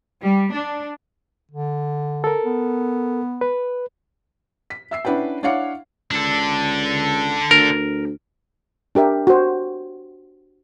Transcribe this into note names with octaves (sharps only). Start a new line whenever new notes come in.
G3
D4
D3
A4 A#4
B3
B4
B6
E5 E6 C7
C#4 D4 E4 B4 F#5 G5
D4 E4 C#5 F5 F#5 D6
C#2 D4 A4
D2 A#4
D4 G4 A#4 E5
F#4 C5